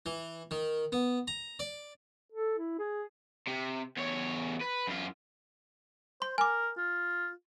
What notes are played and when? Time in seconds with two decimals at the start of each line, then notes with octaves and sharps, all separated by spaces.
0.06 E3
0.51 D#3
0.92 B3
1.28 A#5
1.59 D5
2.32 A4
2.58 E4
2.79 G#4
3.48 C3
3.97 E2 C#5
4.61 B4
4.87 F#2 F4
6.22 C5 C6
6.38 A#4 G#5 D6
6.78 F4